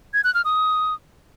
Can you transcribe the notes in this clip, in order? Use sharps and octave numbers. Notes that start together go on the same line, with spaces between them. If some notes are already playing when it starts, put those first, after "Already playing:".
G#6
F#6
F6
D#6